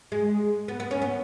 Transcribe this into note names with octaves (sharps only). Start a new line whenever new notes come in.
G#3
B3
B3
C#4
B3